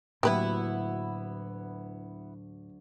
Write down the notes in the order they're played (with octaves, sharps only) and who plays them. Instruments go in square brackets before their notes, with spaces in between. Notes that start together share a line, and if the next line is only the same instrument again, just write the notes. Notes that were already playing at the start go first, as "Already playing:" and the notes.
[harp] D2 F#3 [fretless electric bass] A2 A#3 [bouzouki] B3 E4 [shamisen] G4 B4